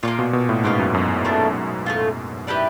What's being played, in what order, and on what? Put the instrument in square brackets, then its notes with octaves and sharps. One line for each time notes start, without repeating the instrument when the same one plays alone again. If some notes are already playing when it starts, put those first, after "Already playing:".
[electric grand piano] A#2 [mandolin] C#4 F4
[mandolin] A#3
[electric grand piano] B2
B2
A2
[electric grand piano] G#2 [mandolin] A#3 C#4 F4
[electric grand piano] F#2
F#2
[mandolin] A3 D4 F4
A3 D4 F4
E4 G4 B4 D5